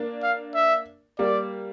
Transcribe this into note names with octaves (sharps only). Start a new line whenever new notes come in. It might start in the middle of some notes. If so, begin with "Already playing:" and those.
Already playing: A#3 D4
F5
E5
G3 A#3 D5